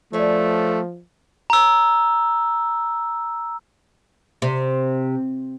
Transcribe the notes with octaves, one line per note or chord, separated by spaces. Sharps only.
F3 A3 D4 G#4 C#5
A#5 E6
C3